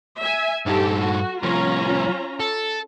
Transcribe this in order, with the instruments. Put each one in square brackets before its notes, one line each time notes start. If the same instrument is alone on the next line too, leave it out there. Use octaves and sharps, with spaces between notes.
[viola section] E5 G#5
[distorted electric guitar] G2 D#4 [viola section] G4 A4
[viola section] F#4
[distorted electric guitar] C2 F3 [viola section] C#4 F4 A#5
[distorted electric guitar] A4